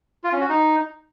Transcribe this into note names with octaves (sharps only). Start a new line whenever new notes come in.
F4
C#4
F#4
D#4